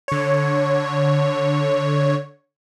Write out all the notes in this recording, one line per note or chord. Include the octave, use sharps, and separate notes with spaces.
D3 C#5